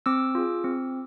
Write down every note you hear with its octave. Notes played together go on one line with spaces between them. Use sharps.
C4 D6 E6
F4 G#4
C4